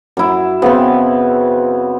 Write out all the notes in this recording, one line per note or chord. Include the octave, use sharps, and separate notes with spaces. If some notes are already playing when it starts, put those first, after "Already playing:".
F#2 E4
C#3 B3 C4